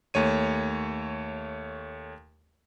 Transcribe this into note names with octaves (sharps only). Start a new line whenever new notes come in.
D#2 A3 C#5 D#7